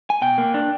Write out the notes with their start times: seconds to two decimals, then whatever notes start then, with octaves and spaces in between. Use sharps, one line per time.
0.10 G#5
0.21 B2 G5
0.38 A#3
0.54 D4